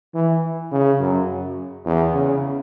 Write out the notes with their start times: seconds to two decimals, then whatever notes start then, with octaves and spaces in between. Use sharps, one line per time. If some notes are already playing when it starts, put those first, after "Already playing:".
0.14 E3
0.72 C#3
1.00 F#2
1.85 E2
2.14 C#3